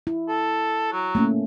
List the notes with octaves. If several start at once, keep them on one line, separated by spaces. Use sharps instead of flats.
E4
A4
F#3
A3 A#3 C#4